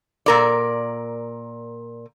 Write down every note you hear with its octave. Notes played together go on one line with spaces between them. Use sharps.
A#2 A#4 D5